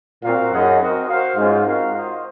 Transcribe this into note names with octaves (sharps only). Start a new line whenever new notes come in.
A#2 C4 F#4 A#4 F5
F#2 D#4 G#4 D#5 F#5
C4 F#4 A#4 D#5
F#4 C5 F5
G#2 C#4 F4 G#4 C5
C4 F#4 A#4 F5
F4 C5 D#5